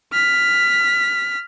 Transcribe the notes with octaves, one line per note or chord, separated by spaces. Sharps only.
F6 B6